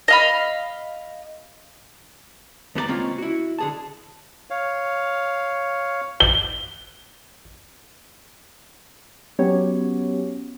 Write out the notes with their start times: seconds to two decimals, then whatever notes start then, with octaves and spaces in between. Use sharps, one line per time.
0.08 D#5 F5 B5
2.75 D#2 B3 C#4 D5 A#5
2.88 C#2 A#3 C4 C#4 F4
3.18 E4 F#4
3.59 D3 G#4 A5
4.50 C#5 F5
6.20 G7
9.39 F#3 B3 C#4 G4 C#5